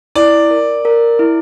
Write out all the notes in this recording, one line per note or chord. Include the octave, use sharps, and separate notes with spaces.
E4 D5
A#4
A#4
E4